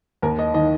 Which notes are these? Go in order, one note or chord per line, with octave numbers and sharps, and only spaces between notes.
D#2 A#4
D#5
D#3 D#5